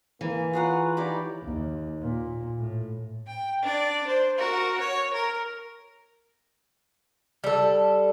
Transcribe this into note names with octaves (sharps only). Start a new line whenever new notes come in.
E3 A#3 G#5
F4 G#4 B4 C#5 F#5 A#5 C#6
D#4 E4 G4 D5 B5
D#2
A#2
A2
G5
D4 D5
C5
F#4 A#4
C#5
A#4
G3 A4